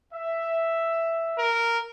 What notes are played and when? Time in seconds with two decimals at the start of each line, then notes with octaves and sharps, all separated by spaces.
0.14 E5
1.38 A#4